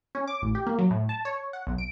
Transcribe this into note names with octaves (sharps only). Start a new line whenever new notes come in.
C#4
D6
A1
G4
A#3
F#3
A2
A5
C#5
F#5
B1
D7